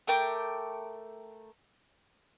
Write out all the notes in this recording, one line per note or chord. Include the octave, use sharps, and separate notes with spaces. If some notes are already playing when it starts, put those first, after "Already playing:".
A3 A#4 G5 D6